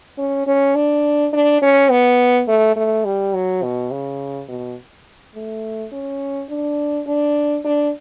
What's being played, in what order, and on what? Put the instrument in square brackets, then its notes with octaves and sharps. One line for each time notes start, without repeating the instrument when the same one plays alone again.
[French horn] C#4
C#4
D4
D4
C#4
B3
A3
A3
G3
F#3
B2
C#3
B2
A3
C#4
D4
D4
D4